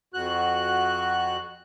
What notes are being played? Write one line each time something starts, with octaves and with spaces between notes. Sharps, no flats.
F2 F#4 F#6